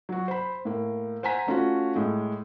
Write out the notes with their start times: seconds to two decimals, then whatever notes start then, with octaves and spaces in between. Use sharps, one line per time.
0.09 F#3 F#4
0.28 C5 B5
0.65 A2 A#3
1.23 C5 F#5 G#5 A#5 B6
1.47 A3 C#4 F4 F#4
1.95 A2 G#3